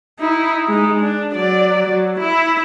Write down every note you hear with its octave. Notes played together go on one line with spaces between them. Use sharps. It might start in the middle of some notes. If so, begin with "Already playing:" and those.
D#4 E4
G#3 D#4
D4
F#3 D5
F#3
E4 E5